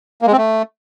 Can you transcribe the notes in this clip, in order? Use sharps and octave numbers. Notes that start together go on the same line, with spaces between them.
A#3
G#3
C4
A3